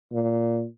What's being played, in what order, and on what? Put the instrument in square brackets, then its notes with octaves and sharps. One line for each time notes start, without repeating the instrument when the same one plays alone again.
[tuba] A#2